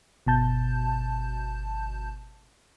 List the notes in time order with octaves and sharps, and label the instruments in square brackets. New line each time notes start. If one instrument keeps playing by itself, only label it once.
[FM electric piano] G1 B2 A5 G6